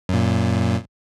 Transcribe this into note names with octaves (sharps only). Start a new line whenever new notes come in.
F#2 A#2